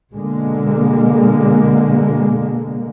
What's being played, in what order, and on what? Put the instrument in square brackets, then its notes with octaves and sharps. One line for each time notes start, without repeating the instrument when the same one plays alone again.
[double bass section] B2 D3 G#3 A#3